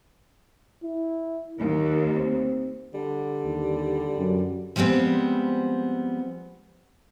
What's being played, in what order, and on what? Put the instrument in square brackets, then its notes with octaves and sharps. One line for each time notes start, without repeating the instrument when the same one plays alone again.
[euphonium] E4
[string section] D#2 [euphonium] D#3
[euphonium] C4
[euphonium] D3 [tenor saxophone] G3
[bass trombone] D#2
F#2
[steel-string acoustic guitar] F3 G3 G#3 B3 C4